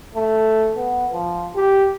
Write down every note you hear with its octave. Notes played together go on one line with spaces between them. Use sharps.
A3
B3
F3
G4